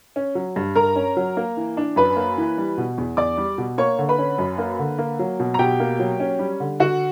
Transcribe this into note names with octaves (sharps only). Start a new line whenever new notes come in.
C#4
F#3
G2
G2 A#4 A#5
C#4
F#3
A#3
E3
D4
F#2 B4 B5
A#3
E3
G3
B2
E2
E2 D5 D6
G3
B2
A#3 C#5 C#6
D3
B4 B5
C#4
F#2
A#3
D3
A#3
F#3
B2
A#5
B2 G4 G5
A#3
F#3
C#4
G3
D3
D3 F#4 F#5